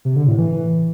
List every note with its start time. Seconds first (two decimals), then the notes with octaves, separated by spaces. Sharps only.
0.05 C3
0.16 D3
0.27 A2
0.38 E3